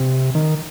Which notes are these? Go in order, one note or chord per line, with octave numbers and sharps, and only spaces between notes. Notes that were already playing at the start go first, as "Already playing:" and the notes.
Already playing: C3
D#3